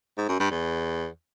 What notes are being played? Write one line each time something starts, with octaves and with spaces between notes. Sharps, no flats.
G#2
F#2
G2
E2